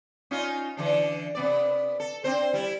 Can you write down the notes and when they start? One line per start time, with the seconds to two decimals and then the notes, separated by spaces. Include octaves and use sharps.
0.31 C#4 D#4 F4
0.77 D3 E3 D4
1.35 C3 B3 D5
2.00 A4
2.24 C4 D4 C5
2.54 G3 E4